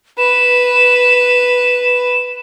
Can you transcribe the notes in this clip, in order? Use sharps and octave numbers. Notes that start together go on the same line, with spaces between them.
B4 E7